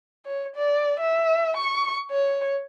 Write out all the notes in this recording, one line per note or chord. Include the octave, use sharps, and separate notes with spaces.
C#5
D5
E5
C#6
C#5